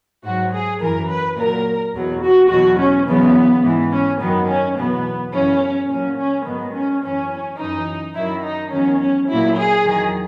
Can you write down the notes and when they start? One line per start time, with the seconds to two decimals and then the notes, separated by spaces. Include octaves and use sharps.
0.24 G#2 F#3 F#4
0.53 G#4
0.81 F#2 E3 A#4
1.09 B4
1.38 A#2 F#3 A#4
1.94 E2 B2 F#3
2.22 F#4
2.51 E2 B2 F#3 F#4
2.79 C#4
3.07 E2 C#3 F#3 B3
3.63 G#2 E3
3.92 C#4
4.20 F#2 D#3 F#3 B3
4.48 C#4
4.77 E2 B2 F#3 B3
5.32 F#2 C#3 E3 C#4
5.89 A#2 F#3 C#4
6.18 C#4
6.45 G#2 D#3 F#3 B3
6.73 C#4
7.03 F#2 E3 C#4
7.58 F#2 E3 D#4
8.15 F#2 D#3 F#3 E4
8.43 D#4
8.71 E2 D#3 F#3 C#4
8.99 C#4
9.28 A#2 F#3 E4
9.57 G#4
9.85 E2 D#3 F#3